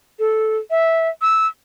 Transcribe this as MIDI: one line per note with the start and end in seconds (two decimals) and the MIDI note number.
0.19 0.57 69
0.71 1.09 76
1.22 1.47 88